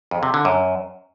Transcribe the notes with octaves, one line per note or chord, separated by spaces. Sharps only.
F2
C3
D3
F#2